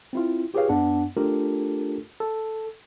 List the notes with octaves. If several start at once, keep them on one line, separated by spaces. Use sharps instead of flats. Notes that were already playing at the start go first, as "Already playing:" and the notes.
C4 E4 F4
F4 G4 G#4 B4 C#5 F5
F#2 B3 D4 F#5
A3 D4 F4 G4 A4 A#4
A4